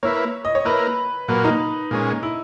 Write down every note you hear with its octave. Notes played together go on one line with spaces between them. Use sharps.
A#3 E4 B4 C#5
D#5
C#5
A#3 E4 A#4 B4
A#2 F#3 A#3 B4
D#4
A#2 G#3 C#4
E4